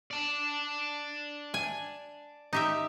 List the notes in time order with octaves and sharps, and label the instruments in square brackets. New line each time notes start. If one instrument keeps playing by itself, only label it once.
[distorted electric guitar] D5 A5
[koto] G#5
D#4 G4 E5